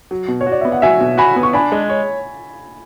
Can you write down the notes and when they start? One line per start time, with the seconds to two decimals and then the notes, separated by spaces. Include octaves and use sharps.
0.11 F#3
0.28 B2
0.41 C#5
0.46 F#4
0.52 D5
0.61 B3 E5
0.72 F#5
0.82 F#3 E5 G#5
1.00 B2
1.18 F#4 G#5 B5
1.36 B3
1.43 C#6
1.53 D4 G#5 B5
1.72 G#3
1.90 C#5